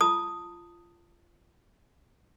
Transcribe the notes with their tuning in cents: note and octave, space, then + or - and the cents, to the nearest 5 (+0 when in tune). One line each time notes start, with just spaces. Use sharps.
F4 -20 A5 +25 D#6 +0